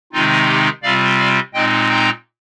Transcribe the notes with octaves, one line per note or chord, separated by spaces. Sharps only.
C3 D#3 G#3 C4 D#4 F4
G4
C3 G3 C4 F4 D5 F5
D5 F5
A#2 G#3 C4 D#4 D#5 G5
G5 A#5